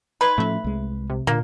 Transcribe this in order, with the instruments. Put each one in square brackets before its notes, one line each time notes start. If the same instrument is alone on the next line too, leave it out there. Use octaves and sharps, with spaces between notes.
[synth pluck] D#4 C6 G#6 [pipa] B4
[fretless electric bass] A2 F3 C#4 [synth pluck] A3 E5
[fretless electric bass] C2 G#3
[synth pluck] C3
[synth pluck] A#2 [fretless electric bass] D3 [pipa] A#3